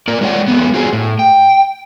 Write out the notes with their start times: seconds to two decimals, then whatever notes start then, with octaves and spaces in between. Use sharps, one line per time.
0.08 A#3 A#4 D5
0.21 G#3 D4 F4 C#5 D5 F#5
0.48 F#3 G#3 A3 B3
0.74 F4 F#4 G#4 C5
0.93 A2
1.19 G5